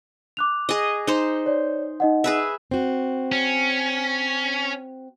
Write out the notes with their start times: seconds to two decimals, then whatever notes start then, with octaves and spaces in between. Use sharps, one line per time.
0.37 D6 F#6 F7
0.69 G#4 D#5
1.07 D#4 C5
1.46 C#5 D5
2.00 D#4 D#5 F#5
2.24 G#4 B4 E5
2.71 C4 F#4
3.32 C#4